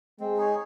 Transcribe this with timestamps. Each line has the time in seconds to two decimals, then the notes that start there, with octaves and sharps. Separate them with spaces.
0.20 G#3 C4
0.37 D#4 G#4 C#5